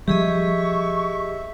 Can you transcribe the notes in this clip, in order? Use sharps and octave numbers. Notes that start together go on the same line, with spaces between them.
F3 G3 G4 G#4 D#5 E5 C#6